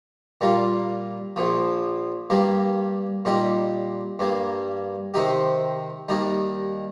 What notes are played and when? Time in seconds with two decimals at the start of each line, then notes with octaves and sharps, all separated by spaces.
0.41 A#2 G3 A#3 F4
1.36 A#1 A#2 F3
2.30 G2 G3 A#3 G4
3.25 A#2 G3 D#4 G4
4.19 G2 G3 A#3
5.14 C3 D#3 C4 D#4 G4
6.09 D#2 D#3 G3 D#4